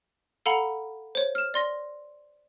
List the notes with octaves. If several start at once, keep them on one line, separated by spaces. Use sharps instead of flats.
A4 F5 F#5 A#5 B5
C5 C#5
F6 E7
D5 C6 A#6